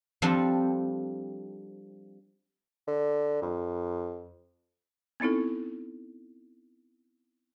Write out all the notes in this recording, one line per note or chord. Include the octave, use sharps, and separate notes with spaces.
F3 G3 C4 D4 A4
D3
F2
B3 C4 D#4 E4 A4